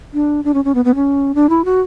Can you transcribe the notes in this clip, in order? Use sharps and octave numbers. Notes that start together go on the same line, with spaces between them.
D4
D4
C#4
C#4
B3
B3
C#4
D4
E4
F#4